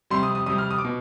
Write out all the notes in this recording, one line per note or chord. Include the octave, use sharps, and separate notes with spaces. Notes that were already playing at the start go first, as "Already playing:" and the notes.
F2 C3 G3 C6
D#6
D#6
F2 C3 G3 D#6
F6
D#6
D6
B2